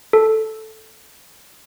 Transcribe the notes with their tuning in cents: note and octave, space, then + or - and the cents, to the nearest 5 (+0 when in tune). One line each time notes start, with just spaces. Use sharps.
A4 -5